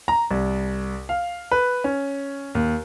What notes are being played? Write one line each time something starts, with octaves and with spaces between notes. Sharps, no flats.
A#5
C2
F5
B4
C#4
D#2